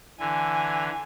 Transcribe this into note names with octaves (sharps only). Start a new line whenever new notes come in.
D3 E3 G#5